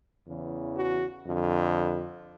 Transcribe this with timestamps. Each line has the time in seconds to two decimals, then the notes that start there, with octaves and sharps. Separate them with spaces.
0.26 E2 C#3 E3
0.75 F#4
1.25 F2 D3